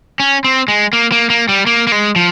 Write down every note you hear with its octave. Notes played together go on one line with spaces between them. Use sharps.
C#4
C4
G#3
A#3
A#3
A#3
G3
A#3
A#3
G#3
F3